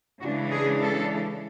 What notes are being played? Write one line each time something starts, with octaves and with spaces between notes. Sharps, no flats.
C#3 E3 G#3 D4 F#4
G#4
A4